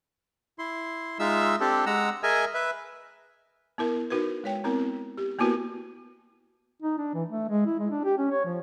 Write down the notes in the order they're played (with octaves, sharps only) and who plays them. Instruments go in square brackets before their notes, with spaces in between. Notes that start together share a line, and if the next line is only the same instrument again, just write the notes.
[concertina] E4 C6
G#3 D#4 F4 E5 E6
C4 D4 G4 A4
G#3 F#5 A#5 E6
G#4 A#4 D#5 E5 G#5
B4 E5
[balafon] B3 E4 A#4
D#4 F#4 A#4 B4
G#3 C#5 G5
B3 C4 E4 A#4
G4
A#3 B3 E4 F#4 A#4 B4
[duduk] D#4
D4
E3
A3
G#3
E4
G#3
D4
G4
C#4
C#5
F3